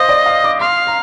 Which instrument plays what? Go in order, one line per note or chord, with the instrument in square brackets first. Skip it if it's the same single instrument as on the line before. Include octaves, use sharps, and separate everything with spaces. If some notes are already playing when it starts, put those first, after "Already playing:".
Already playing: [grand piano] C5 F5 [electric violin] D#5
[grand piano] D5
F5
D6
[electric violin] F5 [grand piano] C6
[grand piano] A#5